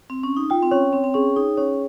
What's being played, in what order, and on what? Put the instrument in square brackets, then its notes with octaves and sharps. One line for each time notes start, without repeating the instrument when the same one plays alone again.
[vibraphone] C4
C#4
D#4
[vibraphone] F4 [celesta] G5
[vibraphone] C4
[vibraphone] C#4 [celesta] C#5
[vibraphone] C4 [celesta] C#5
[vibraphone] C4
[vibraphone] C#4 [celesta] G#4
[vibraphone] D#4 [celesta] G#4
[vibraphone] C#4 [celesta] C#5